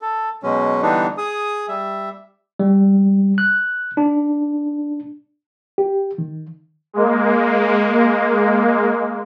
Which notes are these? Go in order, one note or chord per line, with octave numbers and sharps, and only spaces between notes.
A4
B2 F#3 G#3 C#4
D3 E3 G3 B3 D4 D#4
G#4 D#6
G3 E5
G3
F#6
D4
G4
D#3
G#3 A#3